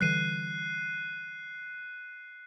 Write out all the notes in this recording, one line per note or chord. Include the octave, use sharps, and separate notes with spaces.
D3 E3 G3 F#6 C7 D#7